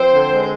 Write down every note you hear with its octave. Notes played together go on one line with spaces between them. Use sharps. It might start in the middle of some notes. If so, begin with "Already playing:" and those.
Already playing: F3 C4 C5
D3
G#3
C5